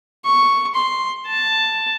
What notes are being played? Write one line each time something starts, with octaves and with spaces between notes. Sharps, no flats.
C#6
C6
A5